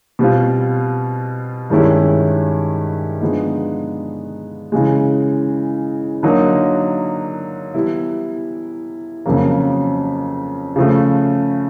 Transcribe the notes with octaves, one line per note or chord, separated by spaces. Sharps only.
B2 G3 C4 F4
G2 D#3 G#3 C#4 E4
D3 F3 G#3 B3 D#4
C#3 E3 G#3
D3 F#3 A#3 D#4
E3 G3 B3 E4
F2 C#3 F#3 A#3
C#3 F3 A3